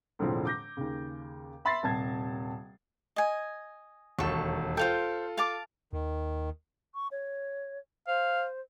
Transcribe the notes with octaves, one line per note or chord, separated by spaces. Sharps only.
E1 A2 D3 F3 C4
D6 G6 A#6
D#2 C#3
E5 B5 C6 A6 A#6 C7
D#1 C3 A5 G#6
D#5 G#5
E1 D#2 A4 C#6
F4 A4 C5 F5 G5
F5 A5 D6
D#2 D#3
C#6
C#5
C5 F5